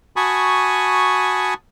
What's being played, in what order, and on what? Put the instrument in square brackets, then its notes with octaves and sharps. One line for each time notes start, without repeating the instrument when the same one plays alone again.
[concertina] F#4 G#5 A5 B5 C#6 D#6